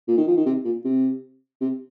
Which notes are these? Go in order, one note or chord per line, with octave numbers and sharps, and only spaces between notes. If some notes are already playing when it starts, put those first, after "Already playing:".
A#2
D#3
F3
D#3
C3
A#2
C3
C3